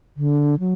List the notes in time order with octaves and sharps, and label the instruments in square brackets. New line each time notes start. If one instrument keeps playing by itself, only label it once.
[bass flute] D3
F#3